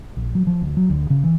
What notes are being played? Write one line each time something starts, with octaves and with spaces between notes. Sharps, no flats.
A#1
F#3
F3
D2
F#3
D2
C#3
E3